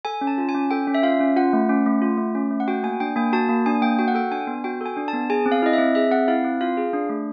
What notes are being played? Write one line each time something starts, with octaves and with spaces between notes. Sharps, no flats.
A4 G#5
C#4
A5
F4
G#5
C#4
A4 G5
C#4
E5
F4 F5
C#4
F4 F#5
A3
C#4
A3
F4
A3
C#4
A3
F#5
F#4 G5
A#3 G#5
D4 G5
A#3 G#5
F#4 A5
A#3
D4 G#5
A#3 G5
F#4 G5
F#5
A4 G5
D4 G#5
B3
F#4 G5
A4 G#5
D4
A5
B3
G#4 G#5
C4
F5
E4 D#5
E5
C4
G#4 E5
C4 F#5
E4 F5
C4
F4 F5
G#4
D4
A3